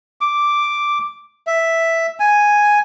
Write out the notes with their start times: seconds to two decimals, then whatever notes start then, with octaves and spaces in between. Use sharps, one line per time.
0.21 D6
1.47 E5
2.20 G#5